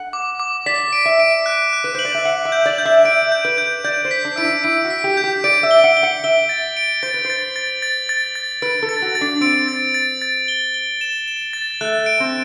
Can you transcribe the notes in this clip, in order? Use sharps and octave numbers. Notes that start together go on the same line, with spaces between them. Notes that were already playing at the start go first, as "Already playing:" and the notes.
Already playing: F#5
D6
D6
D5 B6
D7
E5
D7
F#6
F#6
B4
C5 F#7
D5
E5
F#5 F#7
E5
G6
D5
G6
E5
E5 D7
G6
B4
G6
D5 G6
C5
B6
D4
E4 D7
D4
E4 D7
F#4
B6
G4
G6
G4
D5 D7
E5
G7
F#5
G7
F#5
E5 G7
A6
D7
C5 A6
B4
C5
A6
A6
A6
A6
A6
B4 D7
A4
A6
F#4
A6
D4
C4 D7
A6
A6
A6
G7
G7
E7
E7
A6
A3 F#6
D7
C4